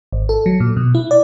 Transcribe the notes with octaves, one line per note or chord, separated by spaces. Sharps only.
G#1
A4
F#3
A#2
B2
E4
D5